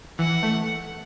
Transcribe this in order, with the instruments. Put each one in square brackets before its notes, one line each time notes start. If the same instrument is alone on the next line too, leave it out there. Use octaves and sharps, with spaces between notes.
[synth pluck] E3 [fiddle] F#5
[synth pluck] A3